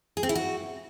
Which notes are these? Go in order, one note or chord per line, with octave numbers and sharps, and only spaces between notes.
G#4
C4
E4
F#4